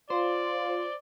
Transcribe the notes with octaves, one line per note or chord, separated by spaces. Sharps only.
F4 C5 D5